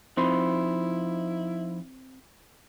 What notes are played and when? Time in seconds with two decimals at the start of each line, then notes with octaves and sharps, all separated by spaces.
0.17 F3 C4 D#4 E4 C5 B5 C6